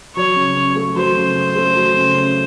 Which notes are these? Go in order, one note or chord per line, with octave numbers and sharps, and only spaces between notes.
F#3 C#5
C#3
C#4
A3
F#3 C5
C#3
C#4
A3
F#3
C#3
C#4